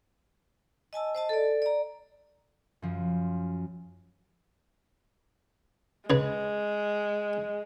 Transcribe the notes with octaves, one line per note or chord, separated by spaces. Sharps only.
D#5 G#5 A5 E6
C5 D#5 A5
A4 D5
D5 A#5
F#2 F3
C#3 G#3 G#4 B4